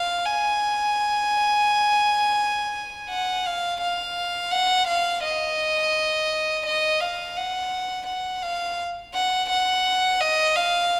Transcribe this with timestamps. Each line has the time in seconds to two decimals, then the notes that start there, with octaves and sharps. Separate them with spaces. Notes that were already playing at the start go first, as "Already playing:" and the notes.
Already playing: F5
0.25 G#5
3.09 F#5
3.46 F5
3.81 F5
4.52 F#5
4.88 F5
5.24 D#5
6.66 D#5
7.01 F5
7.37 F#5
8.07 F#5
8.43 F5
9.14 F#5
9.50 F#5
10.21 D#5
10.56 F5